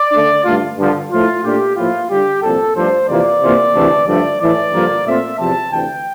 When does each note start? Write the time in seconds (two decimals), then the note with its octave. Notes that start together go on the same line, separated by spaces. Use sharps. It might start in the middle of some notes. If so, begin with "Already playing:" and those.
Already playing: D5
0.12 D3 A3 D4
0.44 G2 D3 A3 D4 F4
0.77 G2 D3 F3
1.10 A2 F3 A3 E4 F4
1.44 A#2 A3 D4 F4 G4
1.76 A2 F3 A#3 E4 F4
2.09 D3 G3 D4 G4
2.42 C2 A#2 F3 C4 A4
2.75 G2 F3 A3 D4 C5
3.08 F2 C3 E3 A#3 F4 D5
3.42 C3 E3 A#3 F4
3.74 D2 C3 E3 A3 E4
4.06 G2 D3 F3 A3 D5
4.40 A2 E3 A3 D5
4.72 G2 D3 F3 A#3 F4
5.06 A#2 A3 C4 F4 E5
5.39 E2 C3 F3 C4 A5
5.72 D2 C3 E3 G5